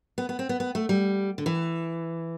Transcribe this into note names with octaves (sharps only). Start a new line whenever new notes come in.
B3
B3
C4
B3
B3
A3
G3
D3
E3